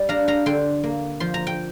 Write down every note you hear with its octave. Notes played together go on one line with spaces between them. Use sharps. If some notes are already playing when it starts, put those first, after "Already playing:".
Already playing: G3 D5
D4 F5 A#5
F5 A#5
D3 G5 C6
A#3
F3 C6
A#5
G5